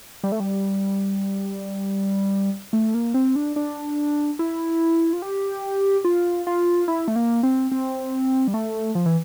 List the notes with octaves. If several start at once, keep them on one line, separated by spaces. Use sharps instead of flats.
G3
A3
G3
A3
A#3
C4
D4
D4
E4
F4
G4
F4
F4
E4
A3
A#3
C4
C4
G3
A3
F3
E3